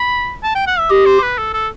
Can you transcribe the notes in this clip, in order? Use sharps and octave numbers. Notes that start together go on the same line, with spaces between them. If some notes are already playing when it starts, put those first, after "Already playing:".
Already playing: B5
A5
G5
F#5
E5
G4 D#5
C5
B4
A4
A4